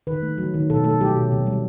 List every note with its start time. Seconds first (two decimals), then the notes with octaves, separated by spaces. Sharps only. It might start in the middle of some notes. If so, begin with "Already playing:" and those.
0.07 D#3 B4
0.22 A3
0.38 F#3
0.54 D#3
0.70 B2 A4
0.84 A3 A4
1.00 F#3 G4
1.16 B2
1.32 C3
1.47 G3